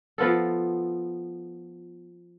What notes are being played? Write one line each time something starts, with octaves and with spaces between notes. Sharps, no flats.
F3 B3 F4 A4